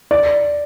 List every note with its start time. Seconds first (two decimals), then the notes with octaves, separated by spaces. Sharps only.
0.11 D5